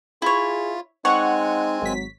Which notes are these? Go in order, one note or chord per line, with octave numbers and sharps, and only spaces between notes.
E4 F4 G#4 C#5
G#3 C4 D#4 C#5 F#5 G#5
G#1 F#3 B6